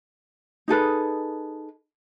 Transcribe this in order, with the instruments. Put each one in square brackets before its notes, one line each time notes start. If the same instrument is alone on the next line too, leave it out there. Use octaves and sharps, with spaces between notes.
[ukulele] D#4 G#4 A4 B4